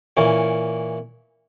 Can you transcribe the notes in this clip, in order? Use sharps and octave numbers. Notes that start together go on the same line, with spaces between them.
A#2 E3 C#4